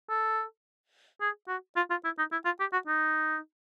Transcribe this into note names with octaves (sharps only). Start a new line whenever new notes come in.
A4
G#4
F#4
F4
F4
E4
D#4
E4
F4
G4
F#4
D#4